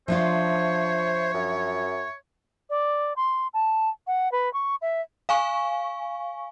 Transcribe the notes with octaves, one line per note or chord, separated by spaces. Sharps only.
F3 D4 F4 C5 C#5 E5
F#2
D5
C6
A5
F#5
B4
C#6
E5
F5 G#5 C#6